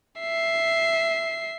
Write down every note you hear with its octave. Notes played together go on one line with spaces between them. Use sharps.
E5 C7